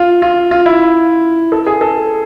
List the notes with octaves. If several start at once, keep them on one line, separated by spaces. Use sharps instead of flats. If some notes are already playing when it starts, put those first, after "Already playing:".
Already playing: F4
F4
F4
E4
A4
G#4
A4